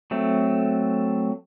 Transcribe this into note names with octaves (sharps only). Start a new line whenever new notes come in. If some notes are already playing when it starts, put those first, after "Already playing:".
F#3 A3 C4